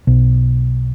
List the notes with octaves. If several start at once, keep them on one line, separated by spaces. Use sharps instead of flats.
B1